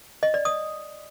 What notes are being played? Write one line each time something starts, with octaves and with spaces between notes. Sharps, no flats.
D#5
D5
D#6